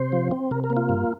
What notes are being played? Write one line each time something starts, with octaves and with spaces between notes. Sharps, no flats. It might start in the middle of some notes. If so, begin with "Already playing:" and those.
Already playing: C3 C5
F3
C4
C3 A#4
A#4
A#3
F4
G2